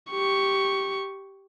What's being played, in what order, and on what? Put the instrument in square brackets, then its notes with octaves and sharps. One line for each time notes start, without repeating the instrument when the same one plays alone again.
[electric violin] G4 C#6